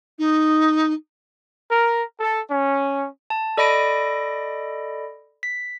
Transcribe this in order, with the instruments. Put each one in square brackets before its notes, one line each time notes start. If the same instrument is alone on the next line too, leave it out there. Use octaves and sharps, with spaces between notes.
[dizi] D#4
[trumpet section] A#4
A4
C#4
[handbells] A5
A4 D5 D#5 B5 A#6 D7
B6